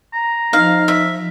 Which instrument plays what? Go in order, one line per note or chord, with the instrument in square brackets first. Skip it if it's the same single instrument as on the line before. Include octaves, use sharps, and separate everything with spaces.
[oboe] A#5
[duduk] F3 [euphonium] D#4 [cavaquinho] F5
[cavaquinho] E5